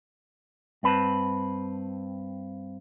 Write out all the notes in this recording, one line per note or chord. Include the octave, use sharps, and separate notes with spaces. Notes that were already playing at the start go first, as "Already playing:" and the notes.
G2 C4 B4 A5